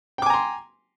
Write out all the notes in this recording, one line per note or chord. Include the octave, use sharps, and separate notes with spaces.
G5 G#5 A#5 C6 D6